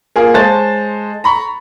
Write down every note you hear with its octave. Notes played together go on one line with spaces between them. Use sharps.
A#3 F4 G#4 A#4
G#3 C5 C#5 A5 A6
A#5 B5 C#6